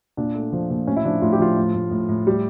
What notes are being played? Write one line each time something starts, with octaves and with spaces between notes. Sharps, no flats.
A#2 D4
A3
F3
A#2
A2 C#4
E4
F3 D4
A2 F4
G4
F3 F4
A2
A2
A2
A2
G3